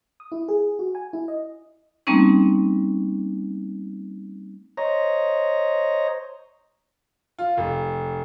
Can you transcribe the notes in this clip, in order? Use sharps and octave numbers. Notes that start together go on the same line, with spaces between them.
D#6
E4
G#4
F#4
G#5
E4
D#5
G3 A3 A#3 C4 C#4 D#4
C5 C#5 D#5 A#5
F4
F1